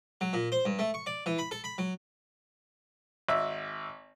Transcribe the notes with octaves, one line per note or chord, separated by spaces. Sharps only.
F#3
A#2
C5
G2
A3
C#6
D5
E3
B5
A4
B5
F#3
G#1 E5